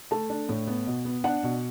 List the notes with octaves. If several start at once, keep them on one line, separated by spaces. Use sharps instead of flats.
A3 A5
D4
A2
B3
B2
B3
D4 F#5
B2